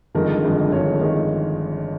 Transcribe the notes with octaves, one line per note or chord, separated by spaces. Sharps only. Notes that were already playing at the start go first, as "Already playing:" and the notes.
G1 F2 D#3 G#3 A#4
G1 F2 D#3 G#3
G1 F2 D#3 G#3 C#5
D#3 G#3